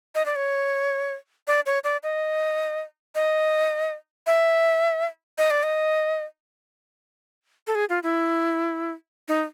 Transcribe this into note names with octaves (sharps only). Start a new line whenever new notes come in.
D#5
D5
C#5
D5
C#5
D5
D#5
D#5
E5
D#5
D5
D#5
A4
G#4
F4
E4
D#4